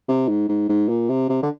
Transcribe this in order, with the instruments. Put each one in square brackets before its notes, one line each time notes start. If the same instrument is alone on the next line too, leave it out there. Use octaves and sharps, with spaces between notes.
[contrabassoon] C3
G#2
G#2
G#2
A#2
C3
C3
D3